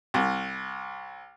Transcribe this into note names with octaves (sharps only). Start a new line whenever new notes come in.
C2